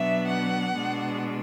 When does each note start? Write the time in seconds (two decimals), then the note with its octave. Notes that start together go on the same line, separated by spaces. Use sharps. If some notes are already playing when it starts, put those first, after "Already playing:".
Already playing: B2 F#3 B3 D4 E5
0.28 F#5
0.75 B2 G#3 D4